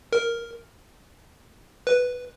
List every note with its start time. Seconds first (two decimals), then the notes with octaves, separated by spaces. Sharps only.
0.13 A#4
1.87 B4